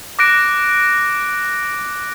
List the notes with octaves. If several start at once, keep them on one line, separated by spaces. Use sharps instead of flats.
D6 F#6 A#6 D7